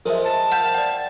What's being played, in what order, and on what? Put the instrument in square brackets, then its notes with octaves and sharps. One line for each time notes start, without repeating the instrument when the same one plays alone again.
[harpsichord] F3 G#3 [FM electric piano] A#4 E5
[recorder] A5
[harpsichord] F5 [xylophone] F#5 G6 E7
[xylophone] D5 G5